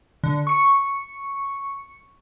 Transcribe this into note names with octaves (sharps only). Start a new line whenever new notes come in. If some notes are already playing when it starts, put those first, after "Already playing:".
D3
C#6 C#7